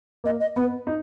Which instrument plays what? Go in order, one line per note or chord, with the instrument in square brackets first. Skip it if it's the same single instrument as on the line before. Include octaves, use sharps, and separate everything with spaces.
[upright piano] A#3 [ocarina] D#5
[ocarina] D#5
[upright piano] B3 [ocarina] B4
[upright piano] D#4